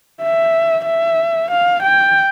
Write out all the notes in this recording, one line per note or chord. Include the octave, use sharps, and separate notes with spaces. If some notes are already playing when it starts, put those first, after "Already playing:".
E5
E5
F5
G5